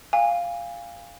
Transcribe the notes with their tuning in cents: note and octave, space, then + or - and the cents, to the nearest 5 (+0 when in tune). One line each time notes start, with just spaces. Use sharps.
F5 +0 G#5 -30